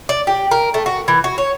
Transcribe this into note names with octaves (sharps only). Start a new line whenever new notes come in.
D5
G4
A#4
A3
F#4
E3
F#4
C#5